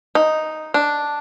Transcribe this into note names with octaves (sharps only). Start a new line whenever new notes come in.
D#4
D4